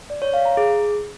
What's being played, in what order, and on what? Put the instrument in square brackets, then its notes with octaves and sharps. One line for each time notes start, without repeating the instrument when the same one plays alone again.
[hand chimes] D5
C#5
F5
A#5
G#4